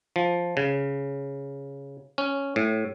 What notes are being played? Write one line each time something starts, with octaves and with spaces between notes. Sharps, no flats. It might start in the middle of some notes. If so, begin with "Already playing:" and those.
F3
C#3
C#4
A2